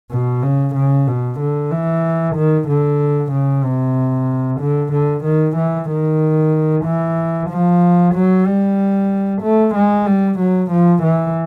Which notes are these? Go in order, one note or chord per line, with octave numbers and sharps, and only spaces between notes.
B2
C#3
C#3
B2
D3
E3
D#3
D3
C#3
C3
D3
D3
D#3
E3
D#3
E3
F3
F#3
G3
A3
G#3
G3
F#3
F3
E3